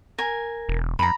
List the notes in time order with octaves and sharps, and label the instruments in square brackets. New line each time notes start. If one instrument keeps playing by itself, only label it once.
[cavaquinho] A#4 G#5
[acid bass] E1
[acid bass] F2 [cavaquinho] A#5 B5